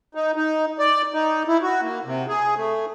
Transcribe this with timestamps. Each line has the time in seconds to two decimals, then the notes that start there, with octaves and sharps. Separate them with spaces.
0.15 D#4
0.36 D#4
0.79 D5
1.14 D#4
1.48 E4
1.62 F#4
1.82 A#3
2.05 C3
2.28 G#4
2.56 A3